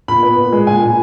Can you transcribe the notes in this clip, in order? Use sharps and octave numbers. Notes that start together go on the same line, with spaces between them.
A#2 B5
B3
A#2
G#3
A#2 G#5
A#2